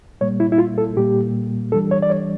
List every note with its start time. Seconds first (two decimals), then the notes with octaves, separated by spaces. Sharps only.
0.21 A#2 G3 A#3 C#5
0.40 E4
0.52 E4
0.58 F4
0.78 A4
0.96 A#2 G3 A#3 G4
1.72 E3 G3 D4 A4
1.91 C#5
2.02 D5
2.10 C#5